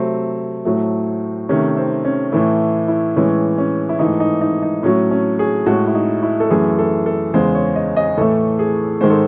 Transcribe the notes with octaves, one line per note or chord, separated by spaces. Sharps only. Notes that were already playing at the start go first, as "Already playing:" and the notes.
Already playing: C3 F#3 A3 C4
A2 F#3 A3
C3 D#3 A3 C#4
C4
C#4
A2 E3 A3 E4
E4
A2 E3 G#3 C#4
C#4
E4
G#2 E3 A3 D#4
D#4
D#4
D#4
A2 F#3 A3 C#4
C#4
G#4
A2 G#3 F#4
E4
D#4
E4
A4
F#2 E3 A3 G#4
A4
A4
E2 C#3 G#3 C5
C#5
D#5
D#5
A2 E3 A3 A4
G#4
G#2 D#3 G#3 C5
A4